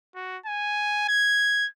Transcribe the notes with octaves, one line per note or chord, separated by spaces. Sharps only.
F#4
G#5
G#6